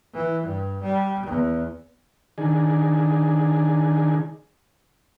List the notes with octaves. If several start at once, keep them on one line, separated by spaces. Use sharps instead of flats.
E3
G2
G3
E2
D#3 D4 G#4